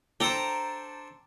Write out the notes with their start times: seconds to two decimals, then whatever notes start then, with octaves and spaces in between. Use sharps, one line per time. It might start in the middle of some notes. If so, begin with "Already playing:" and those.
0.20 D4 A4 C5 G5 A#5